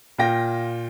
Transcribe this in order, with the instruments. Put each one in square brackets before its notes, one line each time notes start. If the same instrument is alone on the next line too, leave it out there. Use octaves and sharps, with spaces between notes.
[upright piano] A#2 F4 G5 A#6